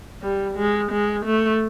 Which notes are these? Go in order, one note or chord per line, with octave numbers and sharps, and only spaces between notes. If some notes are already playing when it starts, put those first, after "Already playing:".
G3
G#3
G#3
A3